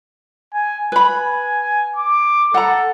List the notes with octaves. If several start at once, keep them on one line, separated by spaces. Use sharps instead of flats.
G#5
B4 G#5 B5
D6
A4 F#5 A#5